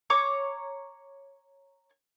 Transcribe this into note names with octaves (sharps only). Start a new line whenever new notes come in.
C#5 A#5 D6